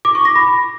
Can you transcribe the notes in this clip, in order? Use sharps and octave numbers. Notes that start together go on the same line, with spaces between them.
D6
C#6
A#6
B5